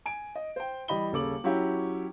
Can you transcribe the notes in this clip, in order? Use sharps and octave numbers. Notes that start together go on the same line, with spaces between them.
G#5 D7
D#5
C5 G5
E3 G3 D#5 B5 G7
D#1 C#3 A4 D6 F#7
F#3 C#4 E4 F#4 G4